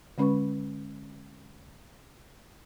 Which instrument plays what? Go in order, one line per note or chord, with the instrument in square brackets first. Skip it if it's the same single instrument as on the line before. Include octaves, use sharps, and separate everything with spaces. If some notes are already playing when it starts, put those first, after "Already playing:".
[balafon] D3 G#3 C#4 B4 B5 C#6